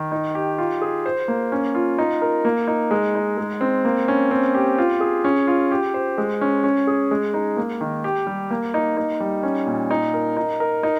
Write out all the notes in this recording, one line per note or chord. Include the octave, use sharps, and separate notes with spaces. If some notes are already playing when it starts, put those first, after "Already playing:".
Already playing: D#3
D#4
G4
F4
G#4
C5
A#3
C#4
F4
D#4
A#4
A#3
D#4
G#3
D#4
G#3
C4
A#3
C#4
C4
G4
F4
G#4
C#4
F4
G4
C5
G#3
C#4
C#4
G#4
G#3
D#4
A#3
D#3
G4
G3
A#3
D#4
D#4
G3
C#4
A#2
D#4
A#4
D#4
A#4
D#4